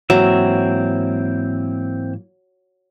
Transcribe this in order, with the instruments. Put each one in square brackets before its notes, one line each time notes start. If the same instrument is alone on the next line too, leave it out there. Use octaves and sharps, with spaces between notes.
[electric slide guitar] G#2 E3 A#3 [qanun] F#3 [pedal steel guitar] C4 E5